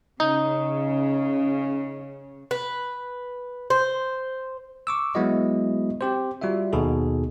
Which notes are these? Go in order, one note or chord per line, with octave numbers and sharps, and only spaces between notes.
C#3 D#4
B4
C5
C#6 D6 E6
F#3 G#3 B3 E4 F#4 D#5
C4 G4 C5
G3 F4 F#4 E5
D#2 B2 B3 D#4 G#4 A4